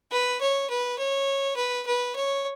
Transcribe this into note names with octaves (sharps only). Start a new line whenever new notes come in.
B4
C#5
B4
C#5
B4
B4
C#5